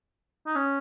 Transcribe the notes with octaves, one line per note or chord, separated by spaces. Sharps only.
D#4
C#4